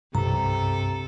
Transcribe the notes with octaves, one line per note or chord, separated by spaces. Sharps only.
C2 G2 C3 A4 A#5